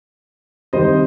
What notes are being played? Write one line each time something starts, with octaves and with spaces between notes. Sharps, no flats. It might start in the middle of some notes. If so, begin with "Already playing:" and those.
C3 D#3 G3 C5 D#5